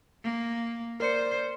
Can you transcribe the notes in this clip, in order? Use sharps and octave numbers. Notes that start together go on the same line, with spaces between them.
A#3
A#4 C5 D5 C#7